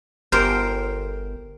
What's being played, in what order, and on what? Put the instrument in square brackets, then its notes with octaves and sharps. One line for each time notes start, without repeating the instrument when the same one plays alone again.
[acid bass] G1 [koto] G4 A#4 C5